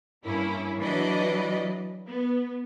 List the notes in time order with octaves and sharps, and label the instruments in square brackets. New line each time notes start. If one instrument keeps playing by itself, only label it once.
[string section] G2 A#3 C#4 E4
E3 F#3 D4 B4 D5 D#5
B3